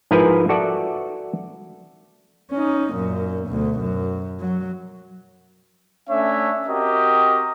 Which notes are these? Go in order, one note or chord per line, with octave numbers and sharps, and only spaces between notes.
G#2 F3 E4 A#4 B4 G#5
F#4 A4 D5 E5 F#5
C#4 D#4
F#2 A#2
D2 B2
F#2
F#3
A3 C#4 D4 C#5 E5
C4 F#4 G4 A#4 D#5